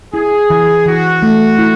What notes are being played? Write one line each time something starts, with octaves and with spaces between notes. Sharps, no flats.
E4 G#4
E3
E3 F#4
A3
E4